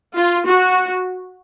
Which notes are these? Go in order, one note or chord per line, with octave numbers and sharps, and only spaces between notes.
F4
F#4